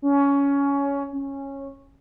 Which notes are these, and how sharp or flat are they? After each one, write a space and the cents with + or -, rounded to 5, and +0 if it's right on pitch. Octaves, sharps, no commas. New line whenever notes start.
C#4 +15
C#4 -10